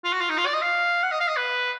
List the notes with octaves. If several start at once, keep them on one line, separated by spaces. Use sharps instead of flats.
F4
F#4
F4
D#4
F4
D5
D#5
F5
F#5
D#5
F5
D#5
B4